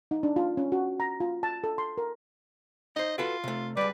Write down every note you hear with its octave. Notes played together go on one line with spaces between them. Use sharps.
D#4
D4
F4
C#4
F#4
A#5
F4
A5
A4
C6
A#4
D#4 C5 D#5
F4 F#4 A4 B4
C3 A3
C#2 G3 B4 D5